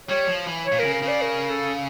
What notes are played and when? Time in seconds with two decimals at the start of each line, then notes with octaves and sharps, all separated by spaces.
0.09 G3 C#5
0.27 F3
0.47 E3
0.65 C#5
0.72 A#2
0.79 C#3 A#4
0.94 A#4
1.02 C#3
1.08 D5
1.22 A#4
1.50 A4